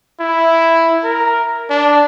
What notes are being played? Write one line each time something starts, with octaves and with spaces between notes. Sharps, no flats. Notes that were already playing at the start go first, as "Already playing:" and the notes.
E4
A#4
D4